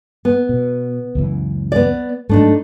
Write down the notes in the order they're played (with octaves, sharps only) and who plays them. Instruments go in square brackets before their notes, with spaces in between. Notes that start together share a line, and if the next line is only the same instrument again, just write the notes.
[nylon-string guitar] B3
[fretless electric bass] B2
C#2 F#2 E3
[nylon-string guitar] B3 D5
[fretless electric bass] G#2 F#3 [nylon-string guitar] A3 D4 D#4